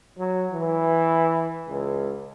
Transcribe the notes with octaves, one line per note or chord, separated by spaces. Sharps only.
F#3
E3
C#2